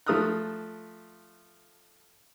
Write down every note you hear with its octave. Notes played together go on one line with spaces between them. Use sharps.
F3 A3 A#5 D#6 F6 F#6